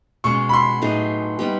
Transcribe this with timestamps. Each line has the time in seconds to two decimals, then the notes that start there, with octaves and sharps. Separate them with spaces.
0.24 B2 G#3 C#4 C#6
0.49 B5
0.53 C6
0.82 A2 F#3 B3 D#4 G#4
1.39 G3 B3 D#4 G4